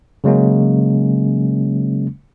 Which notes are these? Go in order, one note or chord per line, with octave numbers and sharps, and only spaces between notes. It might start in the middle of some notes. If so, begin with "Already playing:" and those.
C#3 F#3 G#3 A#3 C#4